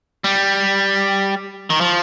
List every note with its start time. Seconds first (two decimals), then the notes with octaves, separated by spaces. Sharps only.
0.24 G3
1.70 D#3
1.81 F3